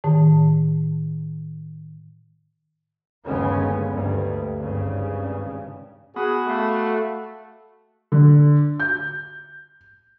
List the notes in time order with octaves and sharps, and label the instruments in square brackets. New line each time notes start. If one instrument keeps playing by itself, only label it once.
[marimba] A2 D#3
[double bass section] G1 D#2 C#3 G#3 B3 C#4
D2 G2
G#1 G2 C#3
[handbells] B3 B5 D#6 [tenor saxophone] F#4 [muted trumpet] G#4
[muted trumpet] A3 [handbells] F5 B5 D6
[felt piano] D3
G6